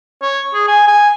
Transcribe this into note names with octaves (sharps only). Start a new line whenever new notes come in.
C#5
G#4
G#5
G#5